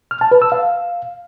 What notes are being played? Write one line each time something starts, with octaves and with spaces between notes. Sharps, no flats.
F6
A5
B4
E6
F5